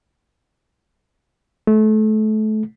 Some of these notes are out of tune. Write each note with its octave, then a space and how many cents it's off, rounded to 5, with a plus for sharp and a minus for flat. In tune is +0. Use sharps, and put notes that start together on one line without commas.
A3 -30